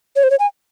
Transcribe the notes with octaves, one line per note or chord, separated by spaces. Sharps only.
C#5
C5
C#5
G#5